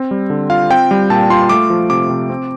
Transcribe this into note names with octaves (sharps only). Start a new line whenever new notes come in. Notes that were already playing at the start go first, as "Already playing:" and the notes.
Already playing: C4
G3
D3
F4 F5
C4 G5
G3
A#2 A5
F4 C6
A3 D6
F3
C3 D6
C3
C4